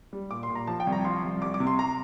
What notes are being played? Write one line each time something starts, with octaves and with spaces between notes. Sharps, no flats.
G3
A#2 D6
C6
A#2
A#5
F3 A5
G5
C2
A#5
F3 C6
C2
C2 D6
D6
C3
C6
A#5